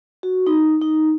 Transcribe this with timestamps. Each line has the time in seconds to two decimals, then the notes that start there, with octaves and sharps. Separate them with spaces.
0.23 F#4
0.47 D#4
0.82 D#4